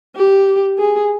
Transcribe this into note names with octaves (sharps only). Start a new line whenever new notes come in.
G4
G#4